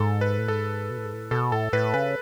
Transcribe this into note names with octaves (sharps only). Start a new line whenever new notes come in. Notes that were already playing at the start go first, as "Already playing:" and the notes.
Already playing: G#2 A4
B4
A2
G#2 A4
B2
A2
G#2
A2
B2 A4
A2 A4
A2 B4
C#3 B4